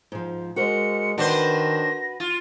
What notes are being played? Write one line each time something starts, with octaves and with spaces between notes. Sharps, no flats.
G#2 F3
G#3 F#4 A#4 C5 C#7
D#3 D4 F#4 B4 C5 A#6
F4